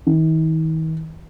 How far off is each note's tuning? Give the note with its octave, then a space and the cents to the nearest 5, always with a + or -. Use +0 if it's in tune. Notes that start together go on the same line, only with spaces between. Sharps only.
D#3 +45